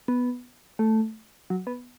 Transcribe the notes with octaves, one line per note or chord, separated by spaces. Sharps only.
B3
A3
F#3
B3